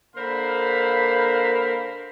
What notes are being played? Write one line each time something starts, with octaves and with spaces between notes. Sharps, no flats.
D3 A#3 A#4 C5 F5 B5